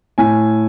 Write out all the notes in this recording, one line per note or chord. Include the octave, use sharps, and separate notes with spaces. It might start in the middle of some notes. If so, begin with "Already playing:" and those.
A2 G#5